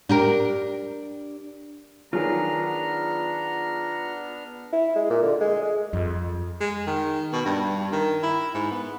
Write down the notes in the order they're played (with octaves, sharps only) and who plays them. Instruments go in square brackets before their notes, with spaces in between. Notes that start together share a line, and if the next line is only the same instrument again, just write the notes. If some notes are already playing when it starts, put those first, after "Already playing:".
[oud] D4 G4 A#4
[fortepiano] D#3 F#3 [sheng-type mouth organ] B3 D4 F6 [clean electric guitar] F4 G#4 [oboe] A#5
[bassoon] E4
G#3
A#2
D3
G#3
G#3
[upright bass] F2
[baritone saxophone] G#3
D#3
B2
G2
D#3
E4
G#2
B3